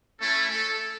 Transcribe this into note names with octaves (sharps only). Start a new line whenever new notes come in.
A3 C#4 E4 A4
A4